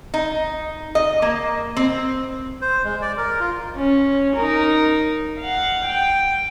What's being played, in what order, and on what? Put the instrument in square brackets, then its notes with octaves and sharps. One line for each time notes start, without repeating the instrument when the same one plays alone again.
[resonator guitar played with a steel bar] D#4
D#5
A#3
C4
[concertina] C5
G#3
D5
A#4
F4
[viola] C#4
D#4 A#4
F5 F#5
G5